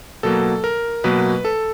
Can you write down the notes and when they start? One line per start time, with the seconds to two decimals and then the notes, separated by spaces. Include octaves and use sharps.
0.23 B2 F#3 A#3 A4
0.64 A#4
1.04 B2 F#3 A#3 B4
1.45 A4